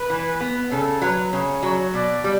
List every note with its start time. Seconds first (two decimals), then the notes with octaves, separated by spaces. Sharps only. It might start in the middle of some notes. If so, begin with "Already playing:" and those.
Already playing: B4
0.10 E3
0.40 B3
0.71 C#3 A4
1.01 F#3 B4
1.32 C#3 C#5
1.63 F#3
1.93 B2 D5
2.24 G3